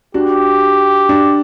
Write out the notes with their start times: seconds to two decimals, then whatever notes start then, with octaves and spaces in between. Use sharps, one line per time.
0.14 D4 F#4 G4
1.09 D4